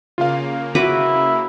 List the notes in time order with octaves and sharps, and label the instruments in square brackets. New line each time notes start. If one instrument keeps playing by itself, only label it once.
[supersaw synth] C#3 A#3 [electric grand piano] F4 F5
[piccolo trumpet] E4 [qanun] F#4 B4 D6